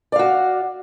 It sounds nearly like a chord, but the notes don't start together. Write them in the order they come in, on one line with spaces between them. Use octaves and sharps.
D5 F5 F#4